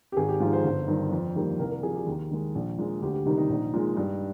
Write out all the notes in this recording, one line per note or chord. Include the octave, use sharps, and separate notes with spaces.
G4
G#1 G#4
G4
G#2 F3 F4
C5
G1
G2 D#3
F2
D#3 G3 A#3
C2 A#4
A#4
C3 F3 G#4
G4
D#2
D#3 G#3
A#1
A#2 F3 G#3
D2 G4
G4
C3 D#3 G3 D#4
D#4
A#1
A#2 G#3
G2